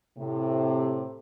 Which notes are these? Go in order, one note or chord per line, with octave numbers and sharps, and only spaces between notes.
A2 C3